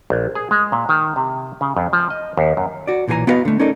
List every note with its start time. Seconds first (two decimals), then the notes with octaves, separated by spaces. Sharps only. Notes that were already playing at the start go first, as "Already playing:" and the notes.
0.10 A#1
0.35 G#4
0.51 G#3
0.72 A#2
0.89 D#3
1.16 C3
1.61 C#3
1.77 F2
1.93 F3
2.10 D#5
2.37 D#2
2.57 F#2
2.87 F#4 D5
3.08 B1 A#2 E3 G#4 G#5 A#5
3.27 B3 E4 F#4 B4 D#5 F5
3.45 D3 A3
3.59 C#4 D#4 A4 A#4 D5 D#5